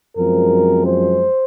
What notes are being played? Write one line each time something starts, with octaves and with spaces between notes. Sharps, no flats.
F#2 F3 G#3 C4 A#4
C5